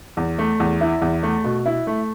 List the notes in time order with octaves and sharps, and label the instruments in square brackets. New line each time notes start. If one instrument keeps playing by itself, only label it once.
[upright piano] E2
A3
E2
E4
E2
A3
B2
E4
A3